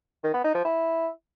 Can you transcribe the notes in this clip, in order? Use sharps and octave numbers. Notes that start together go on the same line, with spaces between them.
D#3
B3
D#4
F3
E4